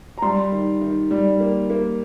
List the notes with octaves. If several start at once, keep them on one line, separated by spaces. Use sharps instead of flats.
A#5
G3 C6
D#3
D#3
G3
A#3
A#3